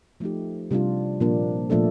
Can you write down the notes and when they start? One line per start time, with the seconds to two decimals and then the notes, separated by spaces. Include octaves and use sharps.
0.20 F3 A3 D#4 G4
0.71 C3 G3 D4 F4
1.20 A#2 F3 A#3 D4
1.70 A#2 F3 A3 D4 A4